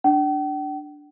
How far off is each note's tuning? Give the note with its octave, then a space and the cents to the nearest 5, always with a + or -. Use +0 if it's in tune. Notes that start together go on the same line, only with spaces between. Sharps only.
D4 +0 G5 -45